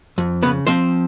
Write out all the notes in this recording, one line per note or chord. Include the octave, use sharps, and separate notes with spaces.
F2
C#3 B3 B4
F3 C4 C5